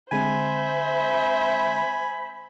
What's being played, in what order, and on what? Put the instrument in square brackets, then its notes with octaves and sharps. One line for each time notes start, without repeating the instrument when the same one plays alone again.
[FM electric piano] D3 G#3 C4 [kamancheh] C5 E5 [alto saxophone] G#5 [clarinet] B5